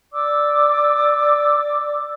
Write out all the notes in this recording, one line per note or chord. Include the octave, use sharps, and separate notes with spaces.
D5 D6 E6